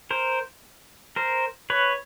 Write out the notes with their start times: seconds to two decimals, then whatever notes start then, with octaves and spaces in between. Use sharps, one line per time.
0.11 A#4 C5
1.16 A#4 C5
1.70 B4 C#5